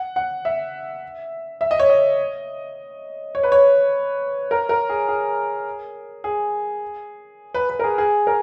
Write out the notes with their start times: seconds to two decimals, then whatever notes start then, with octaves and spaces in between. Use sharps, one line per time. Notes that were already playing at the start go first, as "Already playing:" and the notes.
Already playing: F#5
0.16 F#5
0.45 E5
1.61 E5
1.71 D#5
1.80 C#5
1.90 D#5
3.35 C#5
3.43 B4
3.52 C#5
4.51 A#4
4.69 A#4
4.89 G#4
5.08 G#4
6.24 G#4
7.54 B4
7.70 B4
7.79 A#4
7.84 G#4
7.98 G#4
8.27 A#4